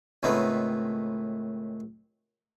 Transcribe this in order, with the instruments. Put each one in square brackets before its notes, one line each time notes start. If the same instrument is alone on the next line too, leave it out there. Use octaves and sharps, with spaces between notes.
[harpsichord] C#2 A2 D#3 B3 C4